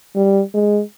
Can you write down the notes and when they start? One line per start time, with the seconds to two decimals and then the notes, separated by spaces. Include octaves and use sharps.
0.15 G3
0.54 G#3